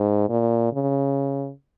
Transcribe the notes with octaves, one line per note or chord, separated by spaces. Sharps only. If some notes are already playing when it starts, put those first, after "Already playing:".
Already playing: G#2
A#2
C#3